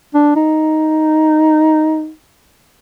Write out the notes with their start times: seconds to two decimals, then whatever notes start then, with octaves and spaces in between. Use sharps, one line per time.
0.14 D4
0.36 D#4